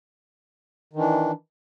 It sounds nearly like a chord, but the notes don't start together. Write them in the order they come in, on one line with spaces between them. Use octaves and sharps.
D#3 E3 D4